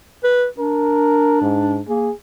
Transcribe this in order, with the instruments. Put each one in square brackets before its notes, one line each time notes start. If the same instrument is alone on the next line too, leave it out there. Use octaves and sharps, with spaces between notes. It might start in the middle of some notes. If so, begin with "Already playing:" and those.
[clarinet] B4
[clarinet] D4 [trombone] A#4
[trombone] G#2
[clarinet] A#3 [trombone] G#4